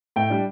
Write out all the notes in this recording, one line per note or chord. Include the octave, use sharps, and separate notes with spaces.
A2 G5
G3 D4